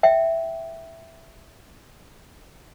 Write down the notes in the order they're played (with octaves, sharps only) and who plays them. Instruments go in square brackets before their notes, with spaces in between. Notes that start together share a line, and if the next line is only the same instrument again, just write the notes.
[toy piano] E5 G5